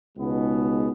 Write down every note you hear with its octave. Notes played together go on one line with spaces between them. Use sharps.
C#2 B2 G#3 B3 D#4